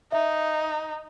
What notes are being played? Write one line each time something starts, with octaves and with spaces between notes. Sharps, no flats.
D#4 E5